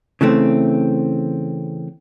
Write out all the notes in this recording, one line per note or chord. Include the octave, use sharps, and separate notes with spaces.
C#3 E3 A3 C4